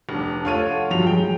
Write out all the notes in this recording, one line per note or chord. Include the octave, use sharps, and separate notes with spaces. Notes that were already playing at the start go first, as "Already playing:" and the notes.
F1 D4
A3 F4 C#5 D#7
F#5
G2 F3 F#3 F7
G#3 G5